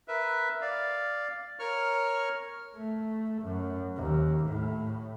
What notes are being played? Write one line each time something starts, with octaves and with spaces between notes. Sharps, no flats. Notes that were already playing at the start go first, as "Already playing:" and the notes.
A#4 B4 E5
D5 F5
A#4 C#5 C#6 F6
A3
F#2
D#2
A2